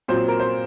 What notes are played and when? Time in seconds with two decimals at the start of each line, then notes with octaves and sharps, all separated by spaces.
0.08 A#2 F#3 C4 C5
0.28 A#4
0.40 C5